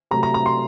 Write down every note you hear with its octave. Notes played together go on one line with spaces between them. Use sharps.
C3 F#3 A3 A#5
A#5
A#5
C6